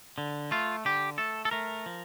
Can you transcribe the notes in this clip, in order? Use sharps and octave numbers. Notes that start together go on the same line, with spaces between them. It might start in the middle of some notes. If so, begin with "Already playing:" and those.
D3
A3 F4
D3 G4
A3 A4
A4
A3 A#4
F3